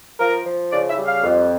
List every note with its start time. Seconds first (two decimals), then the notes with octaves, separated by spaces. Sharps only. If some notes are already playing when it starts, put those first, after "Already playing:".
0.20 F3 A#4
0.46 F3
0.72 C#3 D5
0.89 E5
0.98 G3
1.06 F5
1.24 F2